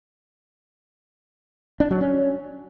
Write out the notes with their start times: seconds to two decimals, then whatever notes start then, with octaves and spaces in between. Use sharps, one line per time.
1.80 D4
1.91 F#3
2.01 C#4